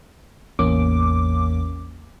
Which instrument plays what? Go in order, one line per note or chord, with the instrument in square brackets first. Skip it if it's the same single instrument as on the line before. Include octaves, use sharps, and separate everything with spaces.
[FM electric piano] A1 E2 A#3 C#4 D6